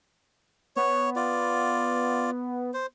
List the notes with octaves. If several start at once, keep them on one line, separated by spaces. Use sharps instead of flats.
B3 C#5
F4 D5
C5